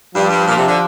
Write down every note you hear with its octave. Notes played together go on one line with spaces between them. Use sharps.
G2 F3 D4 G4 D5
G2
A#2
C3
D3